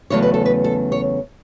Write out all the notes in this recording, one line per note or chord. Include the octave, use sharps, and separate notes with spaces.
E2 C#3 F#3 A3 C#5
B4
A4
B4
A4
C#5